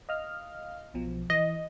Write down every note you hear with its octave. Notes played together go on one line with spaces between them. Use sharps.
D#5 F5 F6
B1 B2 F3
E3 D#5